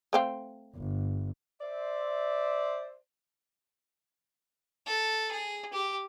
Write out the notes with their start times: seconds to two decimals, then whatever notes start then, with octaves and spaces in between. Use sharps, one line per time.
0.13 A3 C4 F5
0.76 G1
1.61 C5 D5 E5
4.87 A4
5.31 G#4
5.73 G4